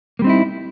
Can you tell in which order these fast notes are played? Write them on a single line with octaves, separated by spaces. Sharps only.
A#3 G3 C4 D#4 E4